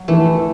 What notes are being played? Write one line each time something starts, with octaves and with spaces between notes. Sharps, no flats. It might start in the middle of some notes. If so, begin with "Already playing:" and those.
Already playing: F#3
E3 A3